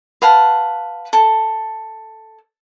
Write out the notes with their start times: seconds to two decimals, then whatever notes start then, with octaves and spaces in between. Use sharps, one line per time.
0.22 B4 F5 F#5 A5
1.13 A4